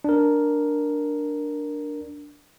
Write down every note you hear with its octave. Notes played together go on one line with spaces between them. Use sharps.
D4 A#4